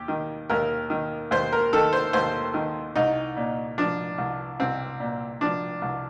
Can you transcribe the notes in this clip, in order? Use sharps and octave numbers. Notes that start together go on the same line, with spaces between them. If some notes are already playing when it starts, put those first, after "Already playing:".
Already playing: D#2 G4
D#3
D#2 A#4
D#3
D#2 C5
A#4
D#3 A4
C5
D#2 C5
D#3
C2 D#4
A#2
F3 D4
C2
C2 C4
A#2
F3 D4
C2